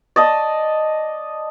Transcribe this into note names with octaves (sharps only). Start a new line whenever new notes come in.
D5 D#5 A5